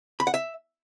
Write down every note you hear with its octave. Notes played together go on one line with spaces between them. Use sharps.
B5
F#5
E5